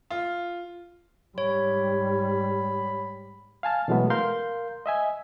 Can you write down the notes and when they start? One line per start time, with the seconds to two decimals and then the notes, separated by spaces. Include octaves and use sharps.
0.10 F4
1.38 G#2 G3 C#5 B5
3.63 F5 G#5 A5 F6
3.88 B2 E3 F#3 G#3 A3 B3
4.10 A#4 F5 C6 G6
4.86 D#5 E5 G#5